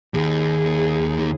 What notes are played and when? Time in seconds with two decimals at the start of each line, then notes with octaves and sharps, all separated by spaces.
0.14 D#2 D#3 G#4